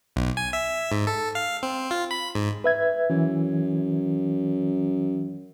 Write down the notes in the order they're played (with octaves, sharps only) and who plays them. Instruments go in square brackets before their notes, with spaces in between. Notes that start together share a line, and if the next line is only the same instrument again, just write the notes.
[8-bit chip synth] B1
G#5
E5
G#2
A4
F5
C4
F4
B5
G#2
[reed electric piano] B4 E5 G#6
[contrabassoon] F#2 [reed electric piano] E3